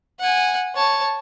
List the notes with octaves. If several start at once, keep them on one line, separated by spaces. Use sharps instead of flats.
F#5 G#5
C#5 A5